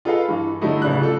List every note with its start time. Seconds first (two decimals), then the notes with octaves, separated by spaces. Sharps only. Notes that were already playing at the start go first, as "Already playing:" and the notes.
0.05 F4 G#4 A4 B4 D#5 F5
0.28 G2 E3
0.61 D3 F#3 G3 A3 D#4 E4
0.82 A1 C#3 D4 F#6
1.00 F4 A4